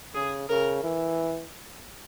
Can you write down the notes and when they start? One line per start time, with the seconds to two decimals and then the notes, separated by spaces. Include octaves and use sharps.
0.14 C#3 G#4
0.49 C#3 A#4
0.83 E3